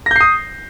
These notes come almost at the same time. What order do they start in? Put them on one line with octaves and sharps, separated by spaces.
A#6 G6 C7 D#6